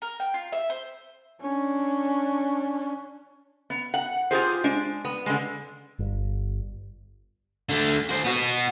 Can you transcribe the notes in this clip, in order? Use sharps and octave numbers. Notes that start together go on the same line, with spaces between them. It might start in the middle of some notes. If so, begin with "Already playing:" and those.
A#4
G5
F4
E5
C5
C#4 D4
B3
F#5
F4 G4 G#4 C5
G#3 D4
B3
D3 G#3
G1
D3 A3
F#4 C5
B3 F#4